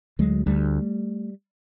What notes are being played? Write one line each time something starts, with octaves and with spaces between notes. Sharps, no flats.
D2 F#3 G#3
D2 G3 A3